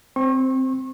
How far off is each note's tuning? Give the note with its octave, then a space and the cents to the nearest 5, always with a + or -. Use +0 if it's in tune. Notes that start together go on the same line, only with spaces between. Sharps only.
C4 +0 C#6 -35